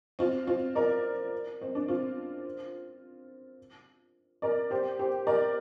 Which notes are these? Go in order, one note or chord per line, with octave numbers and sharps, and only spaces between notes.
C4 F4
C4 F4
A#4 D5
C4
D4
C4 F4
A#4 D5
G4 C5
G4 C5
A#4 D5